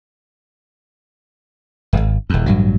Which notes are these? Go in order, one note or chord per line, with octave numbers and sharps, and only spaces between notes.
D1 G#1
D#1 E2
A1 G2 F#3